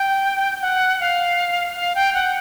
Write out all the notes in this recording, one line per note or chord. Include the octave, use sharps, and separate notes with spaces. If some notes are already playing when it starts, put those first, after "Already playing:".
Already playing: G5
F#5
F5
F5
G5
F#5